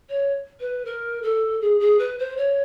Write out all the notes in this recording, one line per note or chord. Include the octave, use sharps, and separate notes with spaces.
C#5
B4
A#4
A4
G#4
G#4
B4
C5
C#5